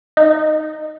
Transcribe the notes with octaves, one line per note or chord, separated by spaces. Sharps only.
D#4